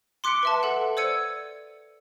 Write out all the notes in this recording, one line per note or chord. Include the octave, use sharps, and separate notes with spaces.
C6 D6 F#6 B6 C#7 D7
B4 E5 A5
A4 F#5
C5 D5 E6 G#6 C#7 D#7